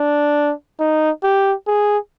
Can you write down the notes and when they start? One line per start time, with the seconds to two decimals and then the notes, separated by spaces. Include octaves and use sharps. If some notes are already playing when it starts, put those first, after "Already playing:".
Already playing: D4
0.80 D#4
1.23 G4
1.67 G#4